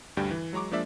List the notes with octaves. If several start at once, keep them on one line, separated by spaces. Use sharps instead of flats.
D2 G2 G3 G5
E3
F#3 G#3 A#5 C#6 D6
F3 G#3 A#3 D4 D5 E5